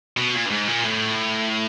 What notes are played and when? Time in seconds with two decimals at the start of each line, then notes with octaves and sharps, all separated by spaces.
0.17 B2
0.34 A#2
0.46 G2
0.51 G#2
0.68 A#2
0.85 A2